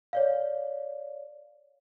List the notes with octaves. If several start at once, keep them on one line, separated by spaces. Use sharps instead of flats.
C#5 D5 F5